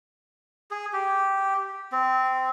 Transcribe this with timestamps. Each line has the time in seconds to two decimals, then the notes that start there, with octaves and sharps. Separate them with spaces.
0.71 G#4
0.93 G4
1.92 C4